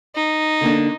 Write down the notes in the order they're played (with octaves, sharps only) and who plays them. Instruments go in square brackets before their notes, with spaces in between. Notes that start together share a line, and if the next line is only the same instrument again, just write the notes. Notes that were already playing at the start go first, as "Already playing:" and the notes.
[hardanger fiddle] D#4
[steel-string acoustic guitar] D3 A#3 D4